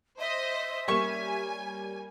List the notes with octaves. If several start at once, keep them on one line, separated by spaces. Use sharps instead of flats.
C5 D#5 E5
G3 A#3 C#4 G#5 C#6 E7